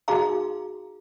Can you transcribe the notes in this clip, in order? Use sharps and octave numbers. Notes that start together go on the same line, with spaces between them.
D#4 F#4 G#4 F5 A#5